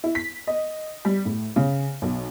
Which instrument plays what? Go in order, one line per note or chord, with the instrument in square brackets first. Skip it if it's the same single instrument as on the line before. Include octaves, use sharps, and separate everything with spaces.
[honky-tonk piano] E4
B6
D#5
G3
A2
C#3
B1